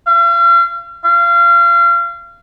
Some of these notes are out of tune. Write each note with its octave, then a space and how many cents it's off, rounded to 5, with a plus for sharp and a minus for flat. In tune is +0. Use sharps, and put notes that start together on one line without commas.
F5 -40
F5 -30